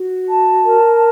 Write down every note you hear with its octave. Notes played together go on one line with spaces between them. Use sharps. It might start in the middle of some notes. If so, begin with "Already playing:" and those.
Already playing: F#4
A5
A#4